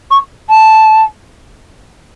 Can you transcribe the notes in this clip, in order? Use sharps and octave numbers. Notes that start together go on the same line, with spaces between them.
C#6
A5